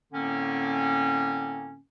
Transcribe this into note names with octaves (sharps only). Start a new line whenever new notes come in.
A2 D3 A#3 C4 C#4